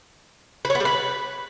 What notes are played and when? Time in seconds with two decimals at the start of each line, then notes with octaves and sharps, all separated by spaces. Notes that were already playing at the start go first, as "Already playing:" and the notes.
0.65 B4
0.70 C#5
0.75 B3
0.80 G3
0.85 B4